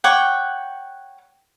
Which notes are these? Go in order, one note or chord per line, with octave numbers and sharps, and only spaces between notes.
C#5 F#5 G5 D6